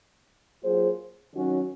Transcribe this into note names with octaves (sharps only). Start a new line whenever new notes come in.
F#3 A#3 F4 G#4 C5
D#3 F#3 C#4 F#4